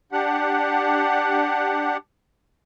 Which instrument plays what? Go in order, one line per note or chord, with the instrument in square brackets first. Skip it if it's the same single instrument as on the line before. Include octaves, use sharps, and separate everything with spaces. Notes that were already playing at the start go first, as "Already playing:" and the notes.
[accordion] D4 G4 F#5